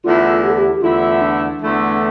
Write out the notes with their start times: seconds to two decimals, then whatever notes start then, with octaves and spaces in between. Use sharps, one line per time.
0.04 E2 D3 A3 E4 F4
0.44 G4
0.50 A4
0.58 G4
0.75 G4
0.82 E2 D3 A3 E4 F4
1.21 D4
1.60 E2 D3 A3 E4